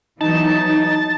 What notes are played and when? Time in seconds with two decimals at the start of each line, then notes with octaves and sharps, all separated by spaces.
0.21 E3 F#3 B3 D#4 A5